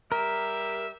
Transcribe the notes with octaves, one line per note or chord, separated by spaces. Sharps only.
G3 G4 A#4 E5